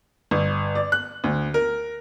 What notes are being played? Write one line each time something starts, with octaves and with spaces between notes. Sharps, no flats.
G1
D5
F#6
D2
A#4